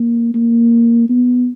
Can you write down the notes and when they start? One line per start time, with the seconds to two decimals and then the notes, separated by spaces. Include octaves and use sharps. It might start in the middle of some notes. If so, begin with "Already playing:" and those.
Already playing: A#3
0.34 A#3
1.09 B3